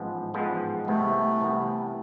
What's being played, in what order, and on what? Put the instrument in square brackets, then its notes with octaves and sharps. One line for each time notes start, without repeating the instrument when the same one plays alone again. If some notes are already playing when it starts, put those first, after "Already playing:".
Already playing: [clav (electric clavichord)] A1 G#2 F3 G#3 B3
A1 G#2 F3 G#3 B3
[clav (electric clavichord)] C2 C3 E3 B3 [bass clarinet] A3
[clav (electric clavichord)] C2 C3 E3 B3